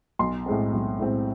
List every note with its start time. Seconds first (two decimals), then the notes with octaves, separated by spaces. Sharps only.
0.19 B1 C6
0.46 A2 G#3 C4
0.73 B1
0.99 A2 G#3 C4